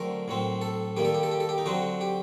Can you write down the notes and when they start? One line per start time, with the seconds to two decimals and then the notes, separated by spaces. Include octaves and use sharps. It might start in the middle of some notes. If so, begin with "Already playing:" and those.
Already playing: D3 F#3 A3 C4 A#4
0.28 A2 F#3 C4
0.61 A4
0.97 D#3 G3 A#3 G4
1.05 A4
1.14 G4
1.23 A4
1.31 G4
1.40 A4
1.49 G4
1.58 D#4
1.66 D3 F#3 C4 F#4
2.01 G4